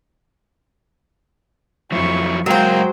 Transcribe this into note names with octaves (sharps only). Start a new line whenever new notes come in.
F2 F3 F#3 E4 C#6
F#2 F#3 G#3 F#4 A#4 C5 F5 G5